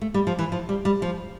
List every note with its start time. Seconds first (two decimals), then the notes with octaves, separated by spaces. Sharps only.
0.02 A3
0.14 G3
0.27 F3
0.39 E3
0.52 F3
0.69 G3
0.85 G3
1.02 F3